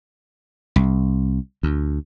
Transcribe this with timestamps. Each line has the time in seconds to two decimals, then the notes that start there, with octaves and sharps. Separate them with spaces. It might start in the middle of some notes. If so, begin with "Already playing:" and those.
0.76 C2
1.63 D2